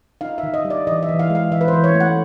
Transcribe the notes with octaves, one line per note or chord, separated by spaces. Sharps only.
D#4 F5
E5
D#3
D#5
G3
D5
E3 D#5
E5
E3
F5
G#3
F5
E3 E5
B4
C5
E3
C#5
A3
F#5